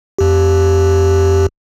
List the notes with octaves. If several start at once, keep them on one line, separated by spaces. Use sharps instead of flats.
F2 G4